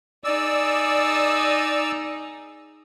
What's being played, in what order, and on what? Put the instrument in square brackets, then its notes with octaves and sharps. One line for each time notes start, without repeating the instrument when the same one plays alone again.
[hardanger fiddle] D#4 G#4 [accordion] D5 E6